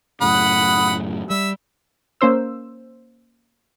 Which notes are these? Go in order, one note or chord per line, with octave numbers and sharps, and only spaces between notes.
F#2 A2 C#3 F#5 B5 D#6
G3 E5
A#3 C#4 C5 E6